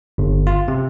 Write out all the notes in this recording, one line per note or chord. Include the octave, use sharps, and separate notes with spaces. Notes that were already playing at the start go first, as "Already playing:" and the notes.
G1
F4
C3